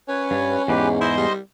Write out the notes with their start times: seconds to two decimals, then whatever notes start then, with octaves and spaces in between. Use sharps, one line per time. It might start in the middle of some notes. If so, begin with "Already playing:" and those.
0.08 C#4 B4 C#5
0.31 G2
0.68 E2 G#2 G4 B4
1.01 E4 C5 D#5 C6
1.17 G3